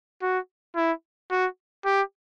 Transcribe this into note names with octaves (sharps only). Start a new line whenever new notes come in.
F#4
E4
F#4
G4